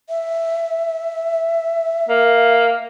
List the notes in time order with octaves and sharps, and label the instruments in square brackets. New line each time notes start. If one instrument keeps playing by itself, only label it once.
[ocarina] E5
[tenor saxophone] A#3